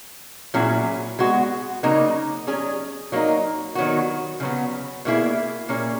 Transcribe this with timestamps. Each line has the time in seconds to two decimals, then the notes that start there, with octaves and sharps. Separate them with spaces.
0.54 A#2 F#3 C#4 E4 G#4
1.19 G#3 B3 F#4
1.83 C#3 F#3 A#3 D#4
2.47 F#3 C#4 G#4
3.12 F#3 A#3 D#4
3.75 D#3 F#3 B3 F#4
4.40 C#3 F#3 B3
5.05 B2 A#3 E4 G#4
5.69 A#2 A#3 C#4 G#4